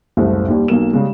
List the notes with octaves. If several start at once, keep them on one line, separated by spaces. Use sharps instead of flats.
F#1 C2 A2 A3
D#2 A#2 G3
B1 B2 A#3 E7
C#3 G3 G#3